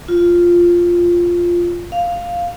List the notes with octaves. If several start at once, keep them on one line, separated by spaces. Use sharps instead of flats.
F4
F5